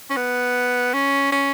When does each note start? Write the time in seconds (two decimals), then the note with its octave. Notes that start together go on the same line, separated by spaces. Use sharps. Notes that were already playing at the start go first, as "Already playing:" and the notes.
0.10 C#4
0.17 B3
0.94 C#4
1.32 C#4